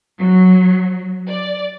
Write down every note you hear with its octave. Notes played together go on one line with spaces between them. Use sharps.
F#3
D5